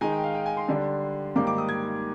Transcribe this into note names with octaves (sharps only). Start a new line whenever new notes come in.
D#3 G#3 D#4 G#5
G5
F5
G5
G#5
C6
D3 G3 D4
G#2 D#3 G3 A#3 D#4 D6
D6
D#6
G#6